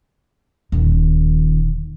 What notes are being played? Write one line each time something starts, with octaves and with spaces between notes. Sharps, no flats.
D#1 D#3